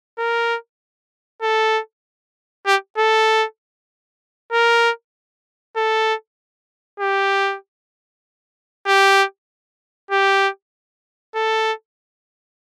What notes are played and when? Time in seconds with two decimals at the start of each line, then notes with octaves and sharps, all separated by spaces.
0.19 A#4
1.42 A4
2.67 G4
2.98 A4
4.53 A#4
5.77 A4
7.00 G4
8.87 G4
10.11 G4
11.35 A4